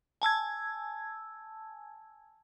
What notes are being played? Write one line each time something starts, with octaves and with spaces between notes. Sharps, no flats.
G#5 A5 E6 G#6